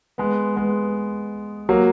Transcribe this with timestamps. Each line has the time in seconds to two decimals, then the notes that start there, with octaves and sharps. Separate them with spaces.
0.18 G#3 B3
0.56 G#3 B3
1.69 F#3 A#3